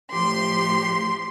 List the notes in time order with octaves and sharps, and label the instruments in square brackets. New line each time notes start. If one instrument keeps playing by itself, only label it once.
[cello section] A2 F3 G4 [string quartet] C6